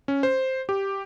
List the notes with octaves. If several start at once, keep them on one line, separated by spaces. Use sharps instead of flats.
C#4
C5
G4